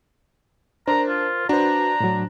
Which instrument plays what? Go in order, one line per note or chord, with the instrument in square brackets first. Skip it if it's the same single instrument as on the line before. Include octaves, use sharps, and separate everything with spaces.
[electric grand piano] D4 [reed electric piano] A#4 C5 [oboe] A#5
[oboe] F4
[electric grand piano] D4 C5 [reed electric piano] F#4 B4 [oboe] A#5
[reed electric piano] A2 F#3